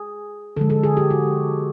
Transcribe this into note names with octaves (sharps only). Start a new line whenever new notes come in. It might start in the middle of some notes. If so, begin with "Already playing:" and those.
Already playing: G#4
D3 F3 G#3 A4
A4
G#4
G4
F#4